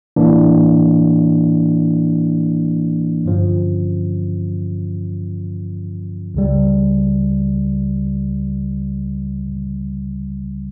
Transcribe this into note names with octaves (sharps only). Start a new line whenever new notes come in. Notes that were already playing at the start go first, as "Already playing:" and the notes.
A2 E3 A#3 D4
G2 D3 F3 C#4
C#2 C#3 G3